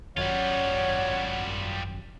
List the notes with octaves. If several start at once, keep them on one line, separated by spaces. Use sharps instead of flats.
G#1 F#2 G3 F4 C#5 F#5